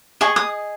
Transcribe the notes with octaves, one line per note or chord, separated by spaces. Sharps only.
G#4 D#5 C#6
D#6